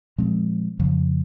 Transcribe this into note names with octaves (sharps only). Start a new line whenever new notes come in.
A#2 F3 G#3 C4
F2 C#3 F3